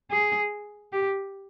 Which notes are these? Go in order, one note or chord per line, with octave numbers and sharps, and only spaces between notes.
G#4
G4